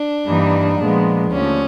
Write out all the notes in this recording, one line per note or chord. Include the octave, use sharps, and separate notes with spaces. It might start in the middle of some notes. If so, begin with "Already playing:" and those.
Already playing: D4
G2 E3 G3 A#3 D#4
A#2 F3 G#3 B3
D#2 D3 F3 A3 C#4